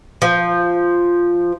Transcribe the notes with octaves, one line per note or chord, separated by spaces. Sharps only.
F3